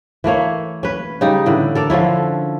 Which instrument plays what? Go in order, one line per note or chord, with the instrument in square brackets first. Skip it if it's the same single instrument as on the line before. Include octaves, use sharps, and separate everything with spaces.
[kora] E3 A3 A#3 C#5
C#4 B4
C#3 G3 D#4
A2 D3 E3
A4 A#4 D5
D3 F3 C#4 E4